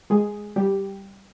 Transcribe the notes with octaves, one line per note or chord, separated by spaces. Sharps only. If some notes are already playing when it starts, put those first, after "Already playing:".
G#3 G#4
G3 G4